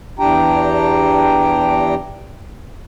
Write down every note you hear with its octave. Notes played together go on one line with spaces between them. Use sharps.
E2 E3 D4 G4 G5 A#5